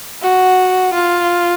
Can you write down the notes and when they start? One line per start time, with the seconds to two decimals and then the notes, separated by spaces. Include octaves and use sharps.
0.22 F#4
0.93 F4